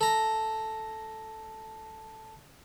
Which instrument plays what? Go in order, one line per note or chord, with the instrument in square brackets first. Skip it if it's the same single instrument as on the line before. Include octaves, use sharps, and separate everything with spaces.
[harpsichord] A4 A#5